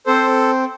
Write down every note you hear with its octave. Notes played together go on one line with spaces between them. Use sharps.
C4 A4 C5